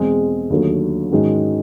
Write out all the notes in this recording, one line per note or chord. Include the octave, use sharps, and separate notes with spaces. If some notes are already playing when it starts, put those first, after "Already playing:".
Already playing: E2 B2 G#3 C4
D#2 D3 F#3 A3
G#2 D#3 G#3 C#4 F#4